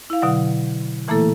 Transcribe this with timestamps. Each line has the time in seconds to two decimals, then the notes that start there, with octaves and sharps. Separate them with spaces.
0.10 E4 F5
0.22 B2 D3 F#3 F#5
1.08 A#2 E3 A3 A#3 E4 A4